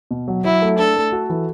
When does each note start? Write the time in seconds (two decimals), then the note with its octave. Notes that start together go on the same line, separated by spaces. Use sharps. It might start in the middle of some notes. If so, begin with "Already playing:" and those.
0.11 B2
0.28 F#3
0.44 F#3 E4
0.62 A3
0.79 D4 A4
0.96 A3
1.12 F#4
1.30 E3